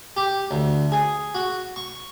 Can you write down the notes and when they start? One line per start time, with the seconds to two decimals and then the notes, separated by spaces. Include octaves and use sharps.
0.16 G4
0.51 D2
0.92 G#4
1.35 F#4
1.76 C#6